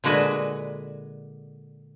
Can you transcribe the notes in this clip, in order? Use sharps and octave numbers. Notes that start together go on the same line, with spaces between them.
A#2 D3 G#3 F#4 B4